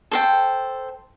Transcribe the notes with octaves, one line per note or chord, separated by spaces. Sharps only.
A4 C5 G5